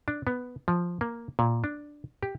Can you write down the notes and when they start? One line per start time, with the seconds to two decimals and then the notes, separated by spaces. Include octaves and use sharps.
0.08 D4
0.27 B3
0.68 F3
1.01 A#3
1.39 A#2
1.64 D4
2.23 G4